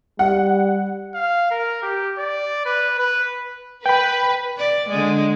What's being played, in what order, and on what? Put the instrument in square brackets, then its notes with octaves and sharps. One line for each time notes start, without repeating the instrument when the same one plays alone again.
[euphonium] G3 [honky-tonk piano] F#5
[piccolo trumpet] F5
A#4
G4
D5
B4
B4
[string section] B4 [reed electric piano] G5 B5
[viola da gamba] D5
D3 G#3